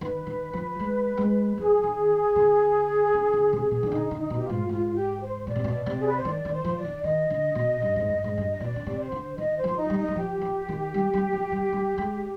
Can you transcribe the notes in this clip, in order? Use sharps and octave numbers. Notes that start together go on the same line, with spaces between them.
D#3 B4
D#3
F3
G#3
G#3
F3 G#4
D#3
D3
D3
D3
C3
B2
D#3 D4
D3 D#4
D3
D#4
B2
G4
F4
G#2
G#2 F4
G4
C5
B2 D5
C3
B2
C3
G#4
B4
C5
D#3 D5
D#3
C5
F3
D5
D#3
D#3 D#5
D3
B2
G2
G#2
G2
G#2
G2
D#5
B2 D5
D3
C3
C5
D3
D#3 D#5
C5
F3
D#4
G3
D#4
G3
F3 G4
F3
D#3
G3
G3
F3
G3
G3
G#3